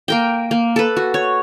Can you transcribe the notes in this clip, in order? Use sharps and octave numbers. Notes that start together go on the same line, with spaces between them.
A#3 A#4 G5
A#3
A4 B4
F#4
C#5